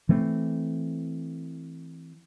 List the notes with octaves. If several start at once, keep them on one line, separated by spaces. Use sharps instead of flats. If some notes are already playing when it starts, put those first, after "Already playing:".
E3 A3 C4